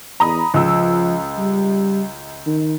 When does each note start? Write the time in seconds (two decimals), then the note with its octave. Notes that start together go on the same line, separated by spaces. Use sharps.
0.20 E2 A#5 B5 D#6
0.54 C#2 F3 E6
1.38 G3
2.46 D#3